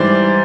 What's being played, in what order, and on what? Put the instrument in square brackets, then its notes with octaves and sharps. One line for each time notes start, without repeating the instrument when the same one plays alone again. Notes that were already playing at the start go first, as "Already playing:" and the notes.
Already playing: [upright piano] G#2 E3 G3 C5 D5